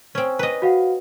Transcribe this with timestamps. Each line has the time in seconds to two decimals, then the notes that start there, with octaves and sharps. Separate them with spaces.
0.15 C4 C#4
0.39 B4 D#5
0.62 F#4 F5 F#5